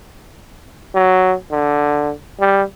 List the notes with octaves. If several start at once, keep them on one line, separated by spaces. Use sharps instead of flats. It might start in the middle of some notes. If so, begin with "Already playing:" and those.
F#3
D3
G3